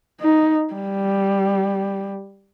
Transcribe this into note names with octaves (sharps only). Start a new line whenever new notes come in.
D#4
G3